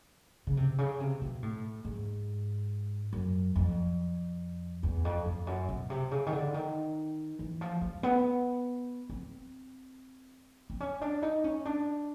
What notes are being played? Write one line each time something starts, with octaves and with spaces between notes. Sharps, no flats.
C#3
C3
C#3
C3
B2
A2
G#2
F#2
F2
E2
F2
F2
F#2
B2
C3
C#3
D#3
D3
D#3
E3
F3
G3
B3
C4
C4
C#4
D4
D#4
C#4
D4